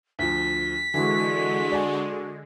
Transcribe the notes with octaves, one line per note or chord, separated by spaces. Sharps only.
D2 F3 B6
D3 E3 G#3 F#4
D5 G#5